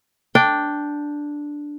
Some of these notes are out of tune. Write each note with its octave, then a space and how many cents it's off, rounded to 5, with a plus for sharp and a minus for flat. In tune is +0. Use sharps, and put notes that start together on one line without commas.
D4 +0 G5 +0